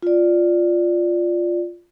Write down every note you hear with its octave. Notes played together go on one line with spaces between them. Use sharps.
F4 D5